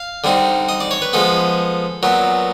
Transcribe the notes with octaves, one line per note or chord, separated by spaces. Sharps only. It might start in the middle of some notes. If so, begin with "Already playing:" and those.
Already playing: F5
D3 G3 C4 D#4
D#5
D5
C#5
B4
F3 G#3 B3 A4
A#2 F#3 B3